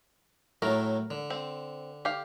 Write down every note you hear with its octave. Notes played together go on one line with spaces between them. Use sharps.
A2 F#3 A3 A#4
D3
C4
G4 F5